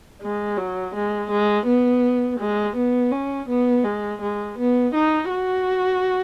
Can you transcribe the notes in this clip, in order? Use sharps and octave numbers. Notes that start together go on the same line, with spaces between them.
G#3
F#3
G#3
G#3
B3
G#3
B3
C#4
B3
G#3
G#3
B3
D#4
F#4